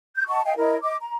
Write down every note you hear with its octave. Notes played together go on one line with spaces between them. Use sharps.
G6
D#5 F#5 A5 C#6
D#5 F5 G5 G#5
E4 A#4 C#5 D#5
D#5 D6
A#5